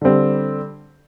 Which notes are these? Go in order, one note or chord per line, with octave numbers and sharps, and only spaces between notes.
D3 G3 C4